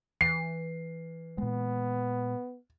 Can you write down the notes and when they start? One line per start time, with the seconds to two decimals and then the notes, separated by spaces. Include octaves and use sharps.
0.21 E3 C7
1.38 A#2 G#3 B3